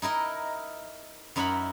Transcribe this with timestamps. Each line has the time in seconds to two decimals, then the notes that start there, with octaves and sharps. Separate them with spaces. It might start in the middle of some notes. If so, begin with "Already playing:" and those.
0.02 D#4 E4 A#4 D#5
1.36 F#2 D#4 E4 A#4 F#5 B5